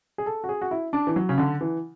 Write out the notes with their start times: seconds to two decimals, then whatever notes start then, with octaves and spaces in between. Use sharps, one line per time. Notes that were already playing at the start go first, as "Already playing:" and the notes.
0.18 G#4
0.26 A4
0.44 F#4
0.49 G#4
0.62 F#4
0.71 E4
0.93 D4
1.07 E3
1.16 F#3
1.29 C#3
1.38 D3
1.61 E3